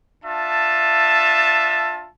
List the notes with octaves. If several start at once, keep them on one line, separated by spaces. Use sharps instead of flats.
D4 F4 E5 A5